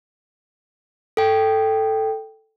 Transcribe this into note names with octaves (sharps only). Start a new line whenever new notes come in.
A4 G5